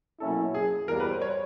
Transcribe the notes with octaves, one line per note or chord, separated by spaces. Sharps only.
B2 F#3 A#3 C#4 E4 A4
G#4
E2 B2 G3 A#3 A#4
B4
C5
C#5